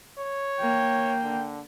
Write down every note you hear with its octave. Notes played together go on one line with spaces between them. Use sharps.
C#5
A#3 G5
D3